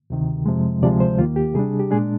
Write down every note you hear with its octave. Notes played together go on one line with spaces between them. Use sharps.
D2 C3 D#3
F2 C3 F3 G#3
D2 C3 F3 G#3 D5
C5
D#2 D#3 A#3 F4
G4
C3 G3 D4 G#4
G4
A#2 G#3 D4 G#4